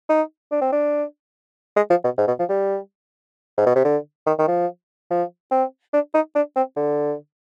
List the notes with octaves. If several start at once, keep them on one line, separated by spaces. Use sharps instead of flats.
D#4
D4
C4
D4
G#3
F3
B2
G#2
B2
F3
G3
G#2
B2
C3
D3
D#3
D#3
F3
F3
C4
D4
D#4
D4
C4
D3